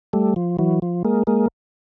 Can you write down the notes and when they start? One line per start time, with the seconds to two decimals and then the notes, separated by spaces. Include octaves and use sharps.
0.13 G3 A3
0.36 F3
0.59 E3 F#3
0.82 F3
1.05 G#3 A#3
1.27 G#3 A#3